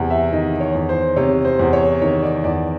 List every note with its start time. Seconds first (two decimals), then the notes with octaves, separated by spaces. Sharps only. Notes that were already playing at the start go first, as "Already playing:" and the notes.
Already playing: E2 C3
0.10 E5
0.32 D#3 D#5
0.60 C#5
0.75 E2
0.89 C5
1.16 C3 C#5
1.45 C5
1.59 E2
1.73 C#5
2.02 D#3 C#5
2.23 D5
2.44 E2 D5